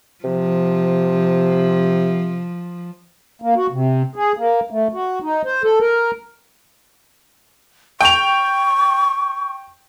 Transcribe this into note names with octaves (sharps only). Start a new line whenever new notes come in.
C3 F3
A#3
F#4
C3
G#4
A#3
A3
F#4
D#4
C5
A4
A#4
G5 C#6 F7